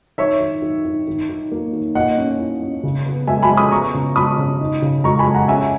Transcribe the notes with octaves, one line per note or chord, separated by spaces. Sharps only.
D#3 C#5 E5
D#3
D#3
D#3
D#3
D#3
A#3
D#3
A#2 D#5 F#5
C#4
E4
C#4
C#3
B3
G#3 E5 G#5
G#5 B5
G#3
B5 D#6
B3 A#5 C#6
C#3
G#3 B5 D#6
C#3
D#4
C#3
G#3 A#5 C#6
G#5 B5
G#3
F#5 A#5
C#4 E5 G#5